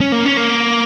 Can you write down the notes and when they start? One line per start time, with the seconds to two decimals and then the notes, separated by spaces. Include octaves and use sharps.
0.01 C#4
0.12 A#3
0.25 C#4
0.37 A#3